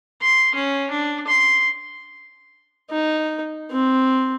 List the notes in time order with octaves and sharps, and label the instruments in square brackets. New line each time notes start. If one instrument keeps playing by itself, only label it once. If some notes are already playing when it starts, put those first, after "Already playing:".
[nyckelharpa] C6
C#4
D4
C6
D#4
C4